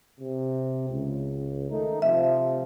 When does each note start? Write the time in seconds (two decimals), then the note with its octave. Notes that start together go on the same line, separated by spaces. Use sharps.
0.20 C3
0.89 C#2
1.70 D#3 A3 D#4
2.02 C3 F3 E5